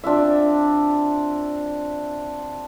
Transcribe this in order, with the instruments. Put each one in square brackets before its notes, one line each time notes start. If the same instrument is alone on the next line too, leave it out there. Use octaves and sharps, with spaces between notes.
[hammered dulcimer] C4 D4 F4 E5